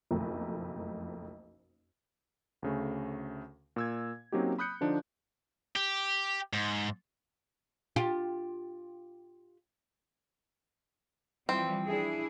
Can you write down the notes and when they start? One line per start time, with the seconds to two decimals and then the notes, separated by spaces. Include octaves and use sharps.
0.11 F#1 B1 F2 A3 F4 A#4
2.62 D2 C#3 A3
3.76 A#2 E6 G#6
4.32 F#3 A#3 C4 C#4 D#4 G4
4.59 B5 D#6 F#6 G6 C#7
4.81 D3 F3 D4 D#4
5.76 G4
6.53 G#2
7.96 F4 G4
11.49 E3 F3 G3 C4
11.86 D4 E4 G#4